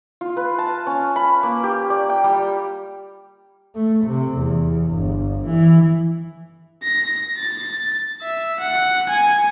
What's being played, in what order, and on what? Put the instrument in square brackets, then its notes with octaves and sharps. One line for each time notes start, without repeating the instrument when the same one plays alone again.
[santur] F4
B4
A5
C#4
B5
A#3
G4
D5
G5
G3
[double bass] A3
C3
E2
G1
E3
[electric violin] A#6
A6
E5
F#5
G#5